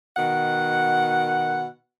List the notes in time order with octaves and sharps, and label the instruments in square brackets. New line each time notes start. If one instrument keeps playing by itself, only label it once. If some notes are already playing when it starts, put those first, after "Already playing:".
[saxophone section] B2 D#3 F#5